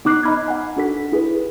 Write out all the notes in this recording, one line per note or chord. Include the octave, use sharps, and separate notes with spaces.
B3 D#4 D6 F#6 A#6 C7
D#5 A#5 B5 F6 G#6
F#5 G#5
D4 F#4 A4 B6
E4 G#4 A4 B4